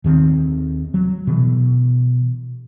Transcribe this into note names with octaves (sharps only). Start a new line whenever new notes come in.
D#2 D#3 A#3 C4
F#3
B2 E3